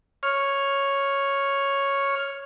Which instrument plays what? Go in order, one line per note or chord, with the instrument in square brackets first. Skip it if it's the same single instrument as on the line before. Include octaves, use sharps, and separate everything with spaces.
[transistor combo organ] C#5 F6